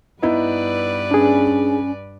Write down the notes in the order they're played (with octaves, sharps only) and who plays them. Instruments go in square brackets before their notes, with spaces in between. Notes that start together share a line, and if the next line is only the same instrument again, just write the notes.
[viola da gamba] G2 B4 D5 [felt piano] B3 D#4 E4
[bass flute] C#4 [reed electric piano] D4 G#4